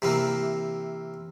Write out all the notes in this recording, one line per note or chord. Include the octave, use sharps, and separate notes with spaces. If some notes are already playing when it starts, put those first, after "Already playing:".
C3 E3 A#3